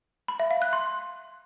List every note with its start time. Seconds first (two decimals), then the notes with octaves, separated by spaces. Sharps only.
0.28 B5
0.40 E5
0.51 F5
0.62 F#6
0.73 C6